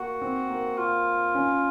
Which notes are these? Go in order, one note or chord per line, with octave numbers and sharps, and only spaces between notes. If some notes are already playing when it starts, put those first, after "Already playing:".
Already playing: A#3 F#4
C4
A#3
F4
C#4